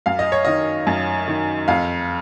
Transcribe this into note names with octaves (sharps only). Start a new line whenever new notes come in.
F#2 F5
D#5
C#5
D#3 D#5
F#2
D#3
F2 F5